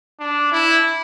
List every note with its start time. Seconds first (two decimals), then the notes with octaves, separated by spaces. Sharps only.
0.20 D4
0.52 E4